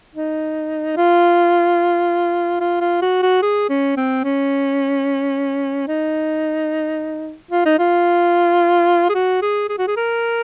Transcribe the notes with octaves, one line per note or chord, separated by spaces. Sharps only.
D#4
F4
F4
F4
F#4
F#4
G#4
C#4
C4
C#4
D#4
F4
D#4
F4
G#4
F#4
G#4
G#4
F#4
G#4
A#4